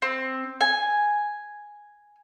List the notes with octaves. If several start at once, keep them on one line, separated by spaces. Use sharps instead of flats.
C4
G#5